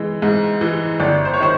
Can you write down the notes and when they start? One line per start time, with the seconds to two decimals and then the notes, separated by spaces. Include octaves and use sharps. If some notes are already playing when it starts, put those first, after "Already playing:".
Already playing: E3 G#3
0.22 G#2
0.61 E3 G#3
1.00 G1 D5
1.25 C5
1.33 C#5
1.40 D#3 C5